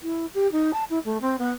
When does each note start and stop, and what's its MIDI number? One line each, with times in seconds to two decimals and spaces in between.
0.03 0.25 64
0.34 0.49 67
0.51 0.70 63
0.73 0.83 81
0.89 0.98 64
1.04 1.20 57
1.21 1.36 60
1.38 1.50 59